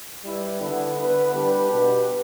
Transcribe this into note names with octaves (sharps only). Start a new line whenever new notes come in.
G3 E4 B4
D3 B3 E4 B4
D3 B3 E4 B4
G3 D4 G4 B4
B2 B3 G4 B4